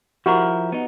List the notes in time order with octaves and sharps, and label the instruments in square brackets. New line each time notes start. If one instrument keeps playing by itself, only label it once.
[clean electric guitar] F3 E4 A#4 [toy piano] F#4 G4 F#5
[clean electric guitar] B3 D#4